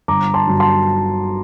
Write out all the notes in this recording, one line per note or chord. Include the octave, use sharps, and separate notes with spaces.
G1 A#5 D6
A5 C6
G2 D3 F#3
A5 C6